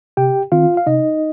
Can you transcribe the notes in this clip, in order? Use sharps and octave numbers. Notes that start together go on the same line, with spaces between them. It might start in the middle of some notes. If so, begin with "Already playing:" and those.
C3 G4 G5
D#3 C4 F4 F5
F5
C3 D#4 D#5